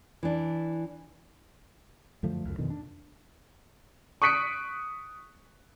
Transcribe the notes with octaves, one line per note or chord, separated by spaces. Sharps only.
E3 D4
F#2 D3 F3 A3
C#2 F#2
F2 B2 D3 D#3
D4
C#6 D#6 F#6 B6 C#7 D7